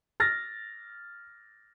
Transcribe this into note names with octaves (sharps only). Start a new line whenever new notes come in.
F6 A6 A#6